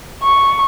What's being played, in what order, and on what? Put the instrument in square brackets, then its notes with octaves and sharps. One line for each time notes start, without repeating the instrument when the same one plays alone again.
[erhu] C#6